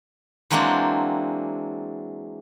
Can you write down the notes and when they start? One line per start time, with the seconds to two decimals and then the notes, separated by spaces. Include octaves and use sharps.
0.50 E3 F#3 G#3 A#3 C4 D4